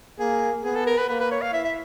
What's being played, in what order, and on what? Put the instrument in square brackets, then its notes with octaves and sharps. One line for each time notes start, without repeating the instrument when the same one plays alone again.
[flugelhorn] A#3 [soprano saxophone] G#4
[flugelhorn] B3 [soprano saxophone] G#4
[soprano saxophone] A4
A#4
B4
[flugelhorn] A#3 [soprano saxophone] B4
[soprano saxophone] B4
C#5
F5
[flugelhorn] E4 [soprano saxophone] E5
[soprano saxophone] E5